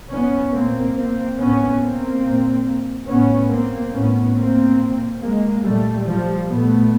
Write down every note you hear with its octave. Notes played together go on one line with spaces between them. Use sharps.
B3 C#4
A#2 A#3 C4
A#3 C4
A2 B3 C#4
A#3 C4
A#2
A2 B3 C#4
A#3 C4
A2 B3 C#4
A#3 C4
A#2
G#3 A#3
A#2 G3 A3
F3 G3
A#2 A3 B3